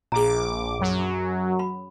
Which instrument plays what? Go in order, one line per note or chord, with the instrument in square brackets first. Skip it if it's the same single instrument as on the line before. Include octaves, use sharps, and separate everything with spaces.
[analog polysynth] A#1 D6 [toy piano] G#4 A#5
[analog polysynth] F#2 F#3
[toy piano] B5